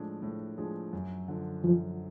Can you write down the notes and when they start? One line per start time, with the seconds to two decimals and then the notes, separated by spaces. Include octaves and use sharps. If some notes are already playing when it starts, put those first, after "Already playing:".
Already playing: A2 F3 G#3 D4 G#4
0.23 A2
0.58 F3 G#3 D4 G#4
0.93 F#2
1.28 D3 F3
1.63 F#2 F3